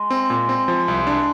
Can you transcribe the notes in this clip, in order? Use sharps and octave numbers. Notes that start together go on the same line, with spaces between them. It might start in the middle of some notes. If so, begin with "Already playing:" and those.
Already playing: G#3
C4
A#2
C4
F3
C2
D4